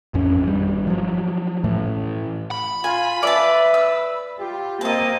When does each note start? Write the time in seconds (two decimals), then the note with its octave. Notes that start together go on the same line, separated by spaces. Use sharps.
0.14 A1 F2 C#4
0.43 G#1 G3
0.87 F3 F#3
1.64 A2 E3 A3
2.51 B5
2.84 F4 G#5
3.23 B4 D5 E5 A5
3.74 E6
4.40 F4 G4
4.81 A#3 C4 A#4 D#5 A5